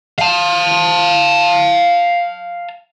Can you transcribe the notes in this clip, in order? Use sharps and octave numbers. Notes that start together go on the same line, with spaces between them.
F5 A5